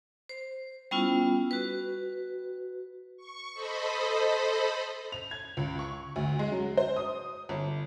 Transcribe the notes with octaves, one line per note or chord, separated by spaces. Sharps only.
C5
G3 B3 C#4 E4 F4
F#4 B4
C#6
A4 C5 D#5 B5
F7
G#6
C#2
C#6
D2
G#3
F#3
C5
D#6
G1